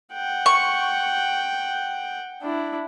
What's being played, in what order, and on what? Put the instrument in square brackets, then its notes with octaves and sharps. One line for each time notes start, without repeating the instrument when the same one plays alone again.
[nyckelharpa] F#5 G5
[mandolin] C#6
[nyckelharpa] D4 E4